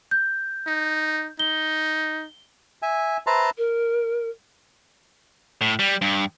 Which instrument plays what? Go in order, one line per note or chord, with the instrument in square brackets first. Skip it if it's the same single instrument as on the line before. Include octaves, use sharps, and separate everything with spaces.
[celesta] G6
[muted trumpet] D#4
[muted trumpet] D#4 [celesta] G7
[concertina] E5 G#5
B4 C5 E5 A5 A#5 C6
[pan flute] A#4
[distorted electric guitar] A2
G3
G2